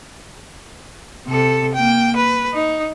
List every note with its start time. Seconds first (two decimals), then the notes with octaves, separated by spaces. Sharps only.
1.27 C3 A4
1.74 A#3 G5
2.16 B4
2.54 D#4